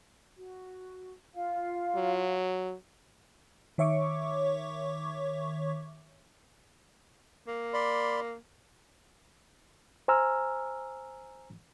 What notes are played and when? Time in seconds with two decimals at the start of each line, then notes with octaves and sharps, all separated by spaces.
0.37 F#4
1.35 F4 F5
1.96 F#3
3.78 D#3 C#5 E5 C#6 D6
7.47 A#3
7.74 D5 B5 C6
10.08 C5 G#5 A#5 E6 F6